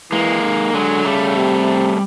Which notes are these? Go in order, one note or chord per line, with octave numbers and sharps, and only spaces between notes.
E3 G#3 A#3
D#3
D3 F#3 G#3
C#3 G3 A3
C3